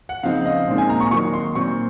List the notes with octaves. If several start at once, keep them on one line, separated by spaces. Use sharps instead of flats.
F#5
C#3 F3 C4 D#4 F5
D#5
A#2 G#3 C4 D#4
G#5
A#5
C#6
D#3 F#3 A#3 D#4 C#6
C6
A#2 F#3 C4 C#6